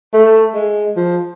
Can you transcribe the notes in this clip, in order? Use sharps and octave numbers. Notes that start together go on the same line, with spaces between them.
A3
G#3
F3